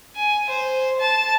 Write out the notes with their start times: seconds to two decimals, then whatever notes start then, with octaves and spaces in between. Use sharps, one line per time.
0.16 G#5
0.49 C5
0.99 A5